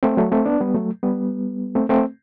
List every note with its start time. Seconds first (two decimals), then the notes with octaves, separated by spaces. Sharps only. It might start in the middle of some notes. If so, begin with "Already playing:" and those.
0.03 A3 C4
0.17 F#3 A3
0.32 A3 C4
0.45 B3 D4
0.60 G3 B3
0.75 F#3 A3
1.03 G3 B3
1.75 A3 C4
1.89 A3 C4